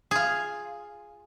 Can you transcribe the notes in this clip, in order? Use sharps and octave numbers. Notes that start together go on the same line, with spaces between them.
F4 G#4